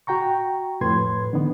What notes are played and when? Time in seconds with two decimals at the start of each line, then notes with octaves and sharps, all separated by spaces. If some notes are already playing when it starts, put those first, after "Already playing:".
0.07 F#4 G5 A#5 C#6
0.81 F2 A2 B4 C6 G#6
1.33 D3 D#3 B3